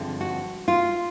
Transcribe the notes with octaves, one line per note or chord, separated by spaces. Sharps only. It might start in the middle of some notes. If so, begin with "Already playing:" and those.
Already playing: G2 D3 F3 G#3 C4
F#4
F4